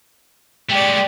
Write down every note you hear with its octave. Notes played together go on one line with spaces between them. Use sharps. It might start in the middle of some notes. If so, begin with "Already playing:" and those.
G#3 A3 G4 D5